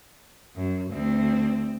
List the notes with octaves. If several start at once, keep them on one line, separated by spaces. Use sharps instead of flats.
F#2
D2 C4